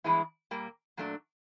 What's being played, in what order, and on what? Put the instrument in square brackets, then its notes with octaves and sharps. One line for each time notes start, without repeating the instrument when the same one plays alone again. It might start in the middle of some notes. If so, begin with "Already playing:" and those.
[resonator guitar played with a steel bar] G2 E3 G#3 B3 E4
A#2 G3 A#3
A#2 F#3 A3 D4